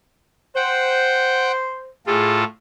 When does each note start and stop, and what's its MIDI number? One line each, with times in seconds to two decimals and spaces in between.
0.56 1.92 72
0.56 1.52 78
0.56 1.52 79
2.07 2.44 45
2.07 2.44 65
2.07 2.40 68
2.07 2.44 69